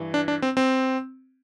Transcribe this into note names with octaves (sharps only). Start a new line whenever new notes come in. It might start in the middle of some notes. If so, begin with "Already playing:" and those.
Already playing: G2 E3
D4
D4
C4
C4